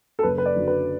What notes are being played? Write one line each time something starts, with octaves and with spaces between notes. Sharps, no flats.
A4
F#1 B4
B4
D5
F#2 D3 F#3
B4